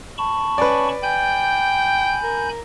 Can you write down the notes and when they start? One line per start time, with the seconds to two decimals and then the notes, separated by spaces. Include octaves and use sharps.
0.18 A5 B5 C#6
0.58 C#4 B4 D5
1.03 G5 G#5 B5 G6
2.23 A#4